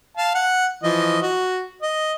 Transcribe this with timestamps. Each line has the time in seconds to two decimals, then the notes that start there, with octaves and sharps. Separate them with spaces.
0.17 F5 A5
0.34 F#5
0.83 E3 F3 D#5
1.22 F#4
1.82 D#5